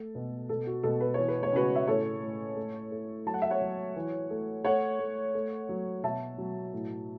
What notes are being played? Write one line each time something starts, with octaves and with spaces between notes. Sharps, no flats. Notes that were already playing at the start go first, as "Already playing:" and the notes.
Already playing: A3 A4
B2
B2 A4
F#4
B2 A4
B4
E3 C#5
B4
C#5
C#3 F#4 B4
E5
A2 A4 C#5
A2
A3
A3
F#3 A5
F#5
E5
C#5 F#5
F#3
E3
A3
A3 C#5 F#5
A3
A3
F#3
B2 E5 A5
F#3
A2